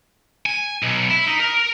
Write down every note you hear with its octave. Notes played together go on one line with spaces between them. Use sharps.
G#5
B1
E4
D#4
A#4